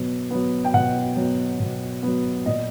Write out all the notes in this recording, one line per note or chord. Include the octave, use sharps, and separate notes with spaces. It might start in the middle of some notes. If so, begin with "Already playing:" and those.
Already playing: B2 F#3 B3
F#3 B3
G5
B2 F#5
F#3 B3
B2
F#3 B3
A#2 D#5